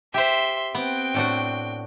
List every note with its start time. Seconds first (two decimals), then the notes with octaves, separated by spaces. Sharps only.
0.14 G4 C5 E5 C6
0.75 B3 C4 G5
1.14 A2 D4 F#4